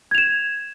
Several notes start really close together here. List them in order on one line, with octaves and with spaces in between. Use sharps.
G#6 F7 E7